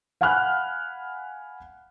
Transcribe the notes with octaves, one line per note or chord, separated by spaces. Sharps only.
F5 F#5 G#5 B5 F6 F#6